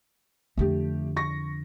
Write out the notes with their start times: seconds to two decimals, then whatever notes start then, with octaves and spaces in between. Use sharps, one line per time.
0.57 F2 D3 A3 G4
1.17 C#6 A#6